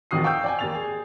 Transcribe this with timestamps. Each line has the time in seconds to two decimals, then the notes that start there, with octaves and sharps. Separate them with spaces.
0.11 A#1 F2 D#3 F#4 D#6 C7
0.24 F5 G5 C#6 E6 G6
0.44 D5 G5 G#5
0.59 D#2 A#3 A6 F7
0.75 G#4